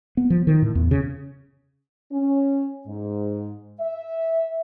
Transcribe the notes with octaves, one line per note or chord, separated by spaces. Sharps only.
B3
F3
D#3
A2
E2
C#3
C#4
G#2
E5